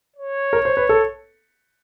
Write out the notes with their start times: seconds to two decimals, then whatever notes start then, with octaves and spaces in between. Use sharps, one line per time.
0.16 C#5
0.53 A#4
0.65 C5
0.77 B4
0.89 A4